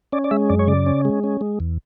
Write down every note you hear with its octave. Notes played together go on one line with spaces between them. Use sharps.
C#4 D5
D5
G#3 E5
F#2 D5
C#5
C#3 D5
C#4
G#3
C#4
G#3
E2